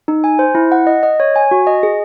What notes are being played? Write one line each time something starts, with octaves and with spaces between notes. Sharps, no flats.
D#4
G#5
C5
E4
F#5
D#5
D#5
C#5
G#5
F#4
D#5
G#4